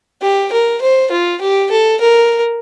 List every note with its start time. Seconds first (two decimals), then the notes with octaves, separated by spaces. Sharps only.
0.22 G4
0.52 A#4
0.82 C5
1.11 F4
1.41 G4
1.71 A4
2.01 A#4